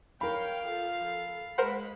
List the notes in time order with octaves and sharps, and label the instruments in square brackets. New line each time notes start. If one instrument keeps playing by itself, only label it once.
[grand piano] A#4 B5 [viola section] C#5 G5 [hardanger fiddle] F5
[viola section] F3 A4
A4
[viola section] G#3 B5 [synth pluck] A#4 C5 F#5